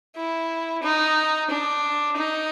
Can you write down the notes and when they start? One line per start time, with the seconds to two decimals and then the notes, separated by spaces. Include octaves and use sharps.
0.16 E4
0.82 D#4
1.50 D4
2.17 D#4